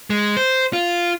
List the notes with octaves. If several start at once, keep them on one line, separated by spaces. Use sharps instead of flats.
G#3
C5
F4